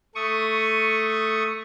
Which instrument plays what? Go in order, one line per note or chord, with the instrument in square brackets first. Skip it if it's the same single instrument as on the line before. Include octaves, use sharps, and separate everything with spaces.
[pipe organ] A3 C#6 D#6